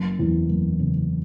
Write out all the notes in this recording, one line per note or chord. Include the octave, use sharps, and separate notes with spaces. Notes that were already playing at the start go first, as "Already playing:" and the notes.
Already playing: F#1
E2
F#1
C#3